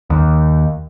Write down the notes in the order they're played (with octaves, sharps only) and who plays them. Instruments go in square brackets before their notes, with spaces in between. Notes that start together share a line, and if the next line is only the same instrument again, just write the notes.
[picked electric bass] D#2